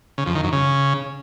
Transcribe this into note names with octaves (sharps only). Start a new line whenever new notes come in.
C#3
F2
D#3
F#2
C#3